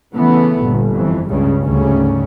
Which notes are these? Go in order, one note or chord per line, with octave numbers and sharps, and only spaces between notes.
C#3 E3 A3 B3
G1 A#2
F2 E3
C#2 G2 C#3
D2 G#2 C#3 G3 C#4